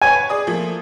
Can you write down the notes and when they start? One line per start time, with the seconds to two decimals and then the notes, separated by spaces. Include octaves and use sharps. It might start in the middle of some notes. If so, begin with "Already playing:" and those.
0.02 B4 C#5 G#5 G#6
0.29 G#4 D5 D#6
0.47 F3 A3 A#3